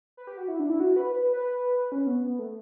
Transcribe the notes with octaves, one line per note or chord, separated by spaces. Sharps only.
B4
G4
F#4
E4
D4
E4
F#4
B4
B4
B4
B4
C#4
B3
B3
A3